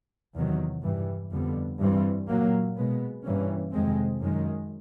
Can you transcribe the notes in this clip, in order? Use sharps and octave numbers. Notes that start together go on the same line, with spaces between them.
E2 C3 D#3 F#3
G2 E3 G3
F2 D3 G3 B3
G2 E3 G3 C4
A#2 F#3 A#3
B2 G#3 B3
G2 E3 G3 A#3 C#4
F2 C3 D#3 G#3 C4
F#2 D#3 G#3